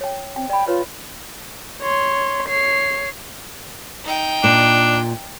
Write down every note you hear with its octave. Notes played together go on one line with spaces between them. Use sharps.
C#5 G5
C4 G5
D5 G5 B5
F4 B4 C#5
C#5 C6
C#5 C7
D#4 G5
A#2 D4